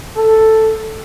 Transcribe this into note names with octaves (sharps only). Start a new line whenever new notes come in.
A4